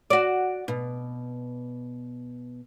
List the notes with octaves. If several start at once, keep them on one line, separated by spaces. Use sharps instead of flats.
F#4 D5
B2